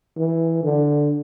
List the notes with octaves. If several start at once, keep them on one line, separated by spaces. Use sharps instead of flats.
E3
D3